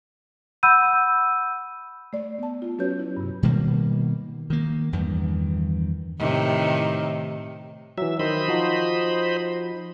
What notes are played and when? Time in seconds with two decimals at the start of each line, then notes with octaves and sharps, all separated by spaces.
0.63 F#5 B5 E6 G6 D#7
2.13 A3 D5
2.38 B3 A5
2.62 F4
2.79 F#3 C#4 F#4 B4 C#5 G6
2.99 E4
3.17 G2 C3
3.43 B2 D#3 G3 A#3
4.50 D#3 A#3
4.93 E2 G2 D#3 E3
6.19 A2 C3 D#3
7.98 E3 F#3 E5
8.20 D#3 C5 D#5 B5
8.48 F3 D#4 F#4